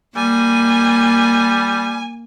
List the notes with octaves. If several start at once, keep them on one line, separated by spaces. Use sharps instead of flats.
G3 A#3 G#5